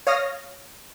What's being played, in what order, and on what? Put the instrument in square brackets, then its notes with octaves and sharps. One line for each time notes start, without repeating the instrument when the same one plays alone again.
[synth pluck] C#5 F5 D#6 F6 A#6